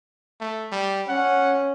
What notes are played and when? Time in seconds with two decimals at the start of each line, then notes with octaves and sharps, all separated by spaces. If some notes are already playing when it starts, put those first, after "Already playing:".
0.41 A3
0.72 G3
1.09 C#4 F#5